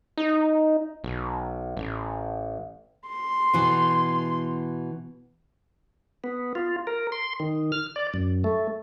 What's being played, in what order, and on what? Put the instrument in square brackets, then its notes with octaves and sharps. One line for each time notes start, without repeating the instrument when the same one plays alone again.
[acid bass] D#4
B1
A1
[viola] C6
[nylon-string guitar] B2 E3
[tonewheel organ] B3
F4
A#4
C6
D#3
F6
D5
F#2
A3